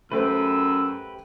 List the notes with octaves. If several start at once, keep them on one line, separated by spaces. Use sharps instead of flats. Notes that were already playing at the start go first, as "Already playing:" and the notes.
F#2 A3 G4 B4 C5 E6